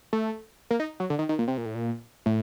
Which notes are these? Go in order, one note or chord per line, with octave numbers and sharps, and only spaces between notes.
A3
A#3
D#4
F#3
D3
D#3
D#3
A#2
C3
A#2
A2
A#2
A2